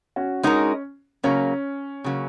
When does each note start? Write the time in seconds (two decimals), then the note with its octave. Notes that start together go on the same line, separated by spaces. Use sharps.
0.16 C#4 F#4
0.43 G#3 C#4 D#4 F#4 A#4
1.24 C#3 F#3 A#3 C#4
2.04 C#3 F#3 A#3